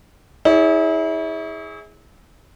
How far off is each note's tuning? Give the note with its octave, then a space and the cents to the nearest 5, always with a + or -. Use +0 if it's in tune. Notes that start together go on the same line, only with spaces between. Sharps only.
E4 -35 G#4 +0 C#5 +25